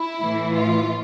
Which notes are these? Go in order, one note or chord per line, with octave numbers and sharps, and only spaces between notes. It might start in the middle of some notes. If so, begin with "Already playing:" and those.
Already playing: E4
A2 E3
F4